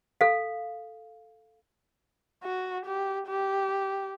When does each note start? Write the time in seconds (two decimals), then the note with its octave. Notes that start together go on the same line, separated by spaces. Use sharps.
0.21 A4 F5
2.44 F#4
2.86 G4
3.28 G4